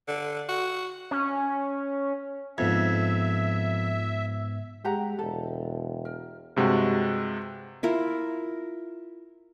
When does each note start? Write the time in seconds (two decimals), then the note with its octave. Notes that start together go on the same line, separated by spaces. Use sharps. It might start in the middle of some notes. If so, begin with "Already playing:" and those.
0.08 D3
0.49 F#4
1.11 C#4
2.58 F2 G#2 B3 E5 G#6
4.85 G#3 G4 F#5 A#5
5.19 E1 A4
6.05 A#4
6.57 G2 C3 G#3 F#4
7.83 E4 F4 A#4